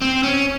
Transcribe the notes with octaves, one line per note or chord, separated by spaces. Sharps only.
C4
C#4